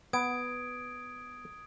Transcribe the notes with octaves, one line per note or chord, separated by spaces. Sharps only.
B3 D#6 G#6 D7